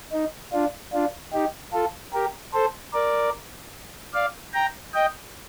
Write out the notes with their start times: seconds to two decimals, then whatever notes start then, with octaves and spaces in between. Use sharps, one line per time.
0.12 D#4
0.53 D4 F4
0.93 D4 F4
1.33 D#4 G4
1.73 F4 A4
2.13 G4 A#4
2.53 A4 C5
2.94 A#4 D5
4.14 D5 F5
4.54 G5 A#5
4.94 D#5 G5